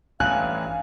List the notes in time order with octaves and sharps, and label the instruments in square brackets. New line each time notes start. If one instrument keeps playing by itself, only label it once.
[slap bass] A1 G2 [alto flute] F5 [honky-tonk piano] G#5 [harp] F#6